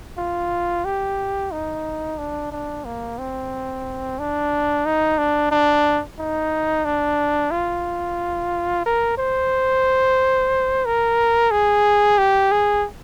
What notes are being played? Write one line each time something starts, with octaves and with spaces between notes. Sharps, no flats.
F4
G4
D#4
D4
D4
A#3
C4
D4
D#4
D4
D4
D#4
D4
F4
A#4
C5
A#4
G#4
G4
G#4